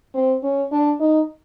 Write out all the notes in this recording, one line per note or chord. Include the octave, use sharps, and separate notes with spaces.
C4
C#4
D4
D#4